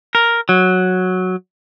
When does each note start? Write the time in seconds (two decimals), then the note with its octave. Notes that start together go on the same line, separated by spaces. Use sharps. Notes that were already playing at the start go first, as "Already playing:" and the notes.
0.15 A#4
0.49 F#3